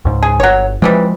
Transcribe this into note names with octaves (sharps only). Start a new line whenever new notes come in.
C#2 G#2
G#4
G1 F#3 C#5
C3 E3 F3 G3 G#3